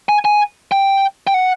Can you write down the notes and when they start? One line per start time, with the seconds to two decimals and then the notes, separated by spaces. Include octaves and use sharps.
0.09 G#5
0.25 G#5
0.72 G5
1.27 G5
1.34 F#5